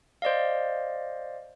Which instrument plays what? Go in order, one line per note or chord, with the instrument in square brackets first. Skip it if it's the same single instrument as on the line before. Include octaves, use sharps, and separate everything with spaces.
[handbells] C5 D5 D#5 F5